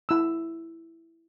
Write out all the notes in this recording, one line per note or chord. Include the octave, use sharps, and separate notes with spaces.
E4 E6